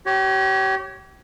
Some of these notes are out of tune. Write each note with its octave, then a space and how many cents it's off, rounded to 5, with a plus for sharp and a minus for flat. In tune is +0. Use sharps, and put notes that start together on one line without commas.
G4 -35 C#5 +0